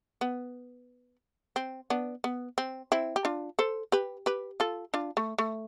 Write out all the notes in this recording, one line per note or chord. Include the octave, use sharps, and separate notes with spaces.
B3
C4
B3 D4
B3
C4
C4 E4
G4
D4 F4
A4 C5
G4 B4
G4 B4
F4 A4
D4 F4
A3
A3